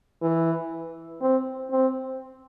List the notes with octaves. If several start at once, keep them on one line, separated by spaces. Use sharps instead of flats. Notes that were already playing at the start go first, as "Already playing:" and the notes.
E3
C4
C4